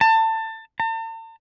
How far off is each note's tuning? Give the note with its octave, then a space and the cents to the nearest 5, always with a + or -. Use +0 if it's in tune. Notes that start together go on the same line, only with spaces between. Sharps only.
A5 +25
A5 +45